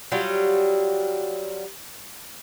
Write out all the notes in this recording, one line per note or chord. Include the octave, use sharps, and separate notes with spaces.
F#3 G3 F4